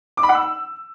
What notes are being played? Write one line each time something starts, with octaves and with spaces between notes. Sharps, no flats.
D6
B5
F#5
E6